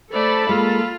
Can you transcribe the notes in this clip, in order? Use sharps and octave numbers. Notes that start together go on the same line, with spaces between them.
A3 A4 C5 D5 A5 B5
G#3 A#3 F4